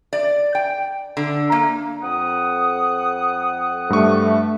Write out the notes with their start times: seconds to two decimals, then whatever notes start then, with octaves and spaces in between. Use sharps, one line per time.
0.13 D5
0.55 G5
1.17 D3
1.52 A#3
2.03 F2 F#5 D#6
3.90 G2 A3 C#6